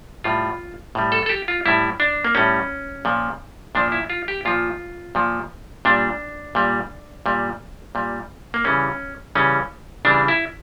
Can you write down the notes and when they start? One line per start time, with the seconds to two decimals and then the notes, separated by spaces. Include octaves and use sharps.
0.24 A2 G3 F4
0.95 A2 G3
1.12 A4
1.26 A4
1.29 G4
1.48 F4
1.66 A2 G3 E4
2.00 D4
2.24 A#3
2.35 A2 G3 C#4
3.05 A#2 F3
3.75 A#2 F3 D4
3.92 E4
4.10 F4
4.28 G4
4.45 A#2 F3 F4
5.15 A#2 F3
5.85 A#2 G3 D4
6.55 A#2 G3
7.26 A#2 G3
7.95 A#2 G3
8.54 A#3
8.64 C#3 E3 G3 C#4
9.35 C#3 E3 G3 C#4
10.05 C#3 E3 G3 D4
10.28 E4